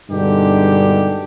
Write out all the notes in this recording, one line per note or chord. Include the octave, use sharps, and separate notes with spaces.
G2 B2 D3 G#3 D#4 G4